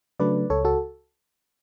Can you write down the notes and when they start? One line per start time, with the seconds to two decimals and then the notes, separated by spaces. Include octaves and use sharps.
0.19 C#3 F#3 A3 D4 B4 D5
0.50 C#2 A4 C#5
0.64 F#4 A4